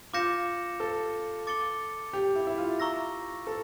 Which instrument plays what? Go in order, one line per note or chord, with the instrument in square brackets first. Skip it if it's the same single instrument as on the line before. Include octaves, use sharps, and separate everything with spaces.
[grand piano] F4 [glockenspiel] D6 G6 A#6 C#7 E7
[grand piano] A4
[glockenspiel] D6 A6 C#7 G7
[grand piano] G4
E4
E4
F4
[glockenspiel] A#5 C#6 E6 A#6
[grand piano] A4